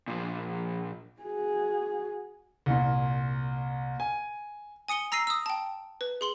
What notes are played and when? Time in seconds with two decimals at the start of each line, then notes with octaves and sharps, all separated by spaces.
0.08 A#2 F3
1.21 F#4 G#4
2.66 C2 A#2
4.00 G#5
4.88 G#5 D#6 C#7 D#7 G7
5.12 A#5 E6 A#6 C7 D#7
5.27 D#6 E6
5.46 G5 A5
6.01 B4
6.21 G#4 C6 F#7